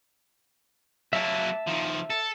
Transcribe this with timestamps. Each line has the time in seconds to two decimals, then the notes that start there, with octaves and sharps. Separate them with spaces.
1.13 F#3 A#3 E5 A5
1.67 D#3 F3
2.10 A4